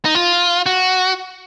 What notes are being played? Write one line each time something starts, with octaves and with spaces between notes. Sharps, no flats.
D#4
F4
F#4